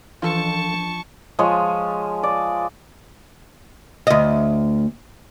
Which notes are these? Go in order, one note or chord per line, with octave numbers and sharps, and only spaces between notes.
E3 F3 D4 F4 A4 A5 C#6
F3 G#3 G#4 C#5
D5
D2 D#5